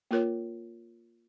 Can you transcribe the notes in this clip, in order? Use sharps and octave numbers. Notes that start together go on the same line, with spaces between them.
A#3 F4 A#4 C#5